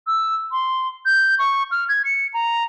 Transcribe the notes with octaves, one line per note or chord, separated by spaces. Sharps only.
E6
C6
G6
C#6
F6
G#6
C#7
A#5